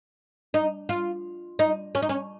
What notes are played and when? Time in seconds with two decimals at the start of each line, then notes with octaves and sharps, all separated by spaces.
0.54 D#4
0.89 F4
1.59 D#4
1.95 C#4
2.02 D#4
2.09 C#4